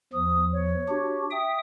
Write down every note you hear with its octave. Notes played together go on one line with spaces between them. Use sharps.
E2 F3 D#6
C#5
D4 F#4 G4
E5 G5 D#6